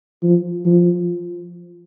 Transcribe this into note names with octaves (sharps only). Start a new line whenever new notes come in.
F3
F3